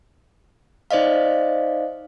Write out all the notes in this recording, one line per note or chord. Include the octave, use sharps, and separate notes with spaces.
D#4 C5 D5 D#5 F5